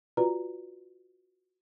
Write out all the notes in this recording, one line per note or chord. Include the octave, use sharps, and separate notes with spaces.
F4 F#4 B4 D5 A#5